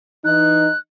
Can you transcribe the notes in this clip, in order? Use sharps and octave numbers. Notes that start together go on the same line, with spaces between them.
E3 D#4 F#6